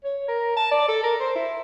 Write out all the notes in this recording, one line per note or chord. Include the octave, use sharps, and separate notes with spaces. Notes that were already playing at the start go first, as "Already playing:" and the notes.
C#5
A#4
A5
D5
A4
A#4
C5
E4